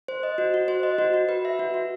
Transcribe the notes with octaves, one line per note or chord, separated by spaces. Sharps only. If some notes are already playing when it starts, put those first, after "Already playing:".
C5
D#5
F#4
F#4
C5
D#5
F#4
F#4
B4
E5
F#4
F#4